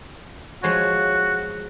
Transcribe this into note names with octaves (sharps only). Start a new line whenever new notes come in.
F3 G#3 F#4 C#5